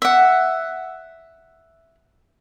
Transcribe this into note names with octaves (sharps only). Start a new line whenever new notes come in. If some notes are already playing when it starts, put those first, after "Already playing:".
E5 F#5